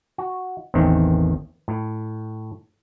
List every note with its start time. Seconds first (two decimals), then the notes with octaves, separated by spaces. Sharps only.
0.18 F#4
0.74 A1 E2 D#3 C4
1.68 A2